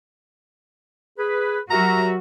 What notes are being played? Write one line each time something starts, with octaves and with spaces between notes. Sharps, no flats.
G#4 B4
F#3 F#4 G4 A#4 E5 A#5